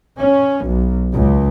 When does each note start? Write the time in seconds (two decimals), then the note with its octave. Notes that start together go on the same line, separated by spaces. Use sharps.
0.19 C#4
0.67 B1
1.14 C#2